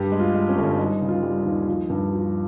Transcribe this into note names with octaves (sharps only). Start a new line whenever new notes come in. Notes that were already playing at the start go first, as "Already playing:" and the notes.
Already playing: G2 G4
G#3
F4
G#3
C#4
G1
G3 D#4
C#3
F4
G3
D#4
D#2
F3
G2
F3